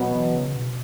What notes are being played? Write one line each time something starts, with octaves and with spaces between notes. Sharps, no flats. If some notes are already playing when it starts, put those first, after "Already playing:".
Already playing: B2 F#3 B3
E3
C#3
B2